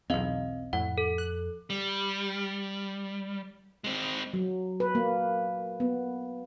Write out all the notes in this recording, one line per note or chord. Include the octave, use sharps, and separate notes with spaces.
B1 E2 C4 D#5 F5
F2 A2 F#5
A4
F#6
G3
G#3 C4
F#3
B4
A#3
B3